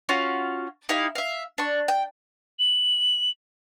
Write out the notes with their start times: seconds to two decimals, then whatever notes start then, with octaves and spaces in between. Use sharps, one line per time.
0.09 C#4 F4 F#4
0.89 D#4 E4 G4 F5
1.15 E5 F5
1.58 D4 C#6
1.88 G5
2.59 F#7